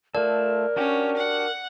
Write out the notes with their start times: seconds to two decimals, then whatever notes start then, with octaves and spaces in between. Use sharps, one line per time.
0.15 A3 F4 A4 A#4 D5
0.76 C#4 D4 F#4 G4
1.16 F#5